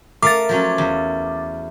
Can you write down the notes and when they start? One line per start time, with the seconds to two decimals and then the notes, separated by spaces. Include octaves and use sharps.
0.22 A3 A#4 F5 D6 A6
0.49 F3 F#3 C#4
0.78 E2